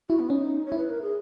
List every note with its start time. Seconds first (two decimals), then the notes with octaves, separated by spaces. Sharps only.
0.09 E4 F#4
0.19 B3
0.30 C#4 D#4
0.66 C#5
0.72 E4
0.78 B4
0.90 A#4
1.02 G#4